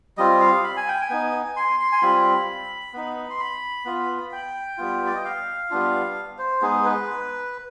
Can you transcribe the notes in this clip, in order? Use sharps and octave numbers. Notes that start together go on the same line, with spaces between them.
G3 C4 F4 D#5
F5
B5
G#5
G5
G#5
B3 D#4
C6
C6
G#5
G3 C4 F4 B5
B3 D#4
C6
B5
B3 F4
G5
G3 B3 F4
D5
D#5
F5
G3 B3 D4 F4
C5
G#3 B3 D#4 G#4
B4